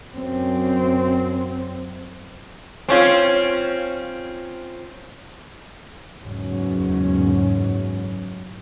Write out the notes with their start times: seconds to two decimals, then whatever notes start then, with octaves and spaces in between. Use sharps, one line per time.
0.14 F#2 C4
2.88 C4 C#4 F4
6.19 F#1 E2 G#2 F#3 C#4